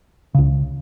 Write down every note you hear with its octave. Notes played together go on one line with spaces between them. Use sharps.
C#2 C#3